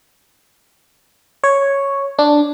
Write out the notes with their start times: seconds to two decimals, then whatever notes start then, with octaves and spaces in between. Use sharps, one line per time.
1.44 C#5
2.19 D4